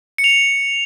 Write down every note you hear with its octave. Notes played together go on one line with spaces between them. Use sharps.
C#7
F7
C#7